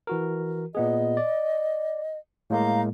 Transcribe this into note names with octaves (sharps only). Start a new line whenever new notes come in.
E3 F#4 A#4
A#2 B3 G#4 D#5
D5
A2 G#3 A#3 F5 A#5 G6